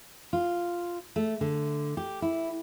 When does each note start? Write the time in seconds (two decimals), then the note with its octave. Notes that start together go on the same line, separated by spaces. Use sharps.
0.33 F4
1.16 A3
1.41 D3
1.97 G4
2.22 E4